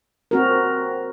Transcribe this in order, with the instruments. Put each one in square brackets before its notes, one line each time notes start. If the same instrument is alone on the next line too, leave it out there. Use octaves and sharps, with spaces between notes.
[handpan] C4 F#4 A#4